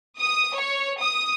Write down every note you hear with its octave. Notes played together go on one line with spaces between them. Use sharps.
D#6
C#5
D#6